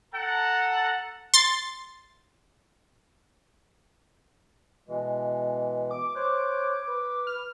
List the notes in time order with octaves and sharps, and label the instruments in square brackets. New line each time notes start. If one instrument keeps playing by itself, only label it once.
[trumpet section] A4 F#5 A5 A#5
[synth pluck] C6 A6
[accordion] B2 E3 G#3
[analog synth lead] D6
[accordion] C5 C#5 F#6
B4
[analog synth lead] F6